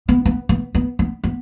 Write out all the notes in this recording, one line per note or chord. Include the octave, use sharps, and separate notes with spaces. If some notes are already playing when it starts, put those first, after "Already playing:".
B3
B3
B3
B3
B3
B3